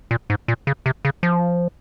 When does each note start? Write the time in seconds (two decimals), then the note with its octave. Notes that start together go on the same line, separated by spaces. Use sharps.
0.11 A#2
0.30 G#2
0.48 A#2
0.67 C#3
0.86 C3
1.05 C#3
1.23 F3